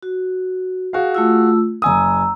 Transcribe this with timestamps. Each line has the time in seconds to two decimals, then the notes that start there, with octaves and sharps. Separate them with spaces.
0.03 F#4
0.93 F#4 G#4 F5
1.15 A3 F4 E6
1.82 F#1 G#5 A#5 D#6 E6